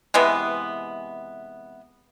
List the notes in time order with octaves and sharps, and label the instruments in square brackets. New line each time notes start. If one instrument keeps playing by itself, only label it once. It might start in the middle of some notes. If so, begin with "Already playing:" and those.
[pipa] C3 E3 G#3 B3